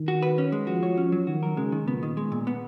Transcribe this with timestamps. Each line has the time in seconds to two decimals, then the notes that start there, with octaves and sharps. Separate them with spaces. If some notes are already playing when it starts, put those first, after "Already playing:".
Already playing: D#3
0.08 F#4
0.22 B4
0.38 C#4
0.52 G#3
0.67 F3 F#4
0.83 C#5
0.97 C#4
1.12 F#3
1.27 D#3 F#4
1.43 A#4
1.57 C#3 G#3
1.72 D#3
1.87 A#2 B3
2.03 D#3
2.17 G#3
2.32 A#2
2.47 B3